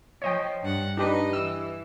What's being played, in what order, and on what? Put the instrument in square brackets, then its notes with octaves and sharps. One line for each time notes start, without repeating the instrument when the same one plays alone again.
[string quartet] F3 [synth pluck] C#5 D#5 G5
[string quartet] G2 F#5
[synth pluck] D4 G4 B4 [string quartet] D#4 D#5
[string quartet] E3 [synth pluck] E6